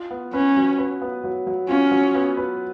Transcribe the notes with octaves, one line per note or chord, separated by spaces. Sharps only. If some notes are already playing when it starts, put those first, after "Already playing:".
Already playing: F4
B3
C#4 B4
F#3
B4
B3
F#3
F#3
C#4 F4
F#3
B3
B4